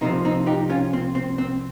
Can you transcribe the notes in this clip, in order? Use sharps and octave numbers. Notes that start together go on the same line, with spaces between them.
C2 C3 F3 C4 D#4
C4 D#4
D#4 G4
C#4 F4
C4
C4
C4